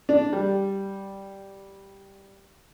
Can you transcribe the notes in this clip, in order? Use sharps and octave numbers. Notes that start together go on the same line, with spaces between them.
D4
G3